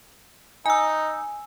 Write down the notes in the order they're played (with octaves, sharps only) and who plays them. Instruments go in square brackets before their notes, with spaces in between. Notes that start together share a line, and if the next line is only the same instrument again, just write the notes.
[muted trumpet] D#4 [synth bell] G#5 E6